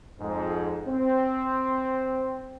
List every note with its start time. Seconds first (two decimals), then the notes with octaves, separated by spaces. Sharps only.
0.20 F2 G#2
0.88 C4